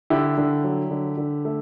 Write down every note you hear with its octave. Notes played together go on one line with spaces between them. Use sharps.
D3 E4 G4
D3
F#3
D3
D3
A3